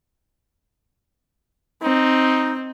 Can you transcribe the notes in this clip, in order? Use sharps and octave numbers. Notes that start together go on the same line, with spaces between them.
C4 D#4